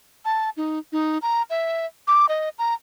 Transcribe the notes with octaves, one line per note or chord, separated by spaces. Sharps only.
A5
D#4
D#4
A#5
E5
D6
D#5
A#5